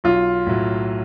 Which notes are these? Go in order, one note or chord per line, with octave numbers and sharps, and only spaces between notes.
B1 F4
A2 F#3